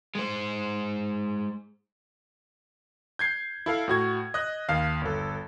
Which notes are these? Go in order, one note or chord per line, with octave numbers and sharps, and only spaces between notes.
G#3 C5
G6 G#6 C7
E4 A4 F5
A2 F#4 G#6
D#5 F#6
D#2 F5
G1 A4